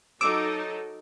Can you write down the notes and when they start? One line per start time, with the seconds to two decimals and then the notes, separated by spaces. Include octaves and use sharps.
0.21 F#3 D#4 A4 D6 E6 D7